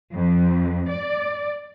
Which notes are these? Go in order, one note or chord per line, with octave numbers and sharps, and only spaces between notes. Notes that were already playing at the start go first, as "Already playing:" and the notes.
F2
D5